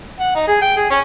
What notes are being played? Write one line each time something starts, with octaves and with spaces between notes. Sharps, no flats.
F#5
D#4
G#4
G5
G#4
C#4